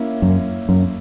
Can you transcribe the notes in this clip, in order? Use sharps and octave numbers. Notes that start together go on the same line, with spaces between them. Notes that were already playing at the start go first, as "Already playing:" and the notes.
Already playing: A#3 C#4 E4
F#2
F#2